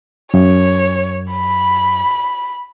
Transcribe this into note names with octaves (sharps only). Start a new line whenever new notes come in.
F#2 C#5
B5